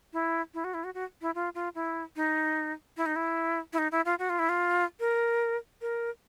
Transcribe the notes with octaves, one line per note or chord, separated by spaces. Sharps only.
E4
E4
F#4
E4
F#4
F#4
E4
F4
F4
E4
D#4
E4
D#4
E4
E4
D#4
E4
F4
F#4
F4
E4
F4
A#4
A#4